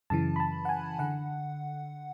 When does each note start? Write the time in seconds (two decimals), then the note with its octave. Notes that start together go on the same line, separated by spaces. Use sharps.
0.10 F#2 C#3 E3 A5
0.36 B5
0.40 A5
0.65 F#5
0.69 G#5
0.99 D3 F#5